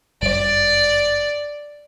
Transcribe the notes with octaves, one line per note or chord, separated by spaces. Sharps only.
G1 F#2 G3 D5